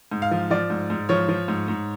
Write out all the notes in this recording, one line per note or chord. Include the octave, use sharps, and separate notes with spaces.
G#2
F5
F3
F3 D5
G#2
G#2
F3 C#5
F3
G#2
G#2